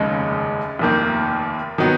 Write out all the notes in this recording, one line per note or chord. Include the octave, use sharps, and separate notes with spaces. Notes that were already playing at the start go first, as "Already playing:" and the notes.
Already playing: F1 D#2 C#3 G#3 D#4
F1 D#2 D#3 A#3
D#3 F#3 B3 D#4